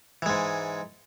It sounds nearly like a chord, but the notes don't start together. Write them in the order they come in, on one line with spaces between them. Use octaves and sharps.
E3 G#3 G#2